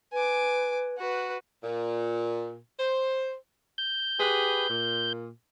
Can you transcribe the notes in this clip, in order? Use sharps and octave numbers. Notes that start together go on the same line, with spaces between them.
B4 G#5 D6
F#4 B4
A#2
C5
G6
G4 G#4 B4
A#2